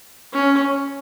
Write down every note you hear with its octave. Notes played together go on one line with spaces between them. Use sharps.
C#4